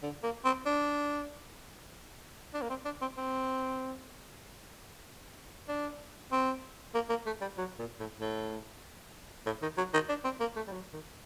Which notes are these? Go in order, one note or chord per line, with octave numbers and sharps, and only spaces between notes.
D3
A#3
C4
D4
D4
A#3
C4
D4
C4
C4
D4
C4
A#3
A#3
A3
G3
F#3
A#2
A2
A2
A2
D#3
F#3
D#3
D4
C4
A#3
A3
G3
F#3
D#3